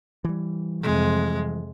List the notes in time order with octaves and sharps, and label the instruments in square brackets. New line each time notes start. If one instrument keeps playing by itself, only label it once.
[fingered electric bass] E3 G3
[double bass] F2 C3 [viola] G#3